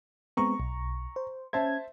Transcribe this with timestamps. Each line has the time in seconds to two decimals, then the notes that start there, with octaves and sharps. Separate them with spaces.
0.37 G#3 B3 C4 A#5 C#6
0.60 B1
1.16 C5
1.53 C#4 C5 E5 A5 G#6